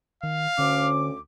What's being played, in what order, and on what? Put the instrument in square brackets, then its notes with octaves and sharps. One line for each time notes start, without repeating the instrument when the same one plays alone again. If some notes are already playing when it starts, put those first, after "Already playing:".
[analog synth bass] D#3 [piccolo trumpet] F5
[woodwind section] D2 D6 [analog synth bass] D3 [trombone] C#4